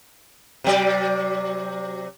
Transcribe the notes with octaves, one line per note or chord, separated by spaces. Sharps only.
C3 F#3 D5